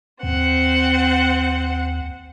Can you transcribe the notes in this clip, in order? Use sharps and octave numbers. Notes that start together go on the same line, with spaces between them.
D#2 C4 F#5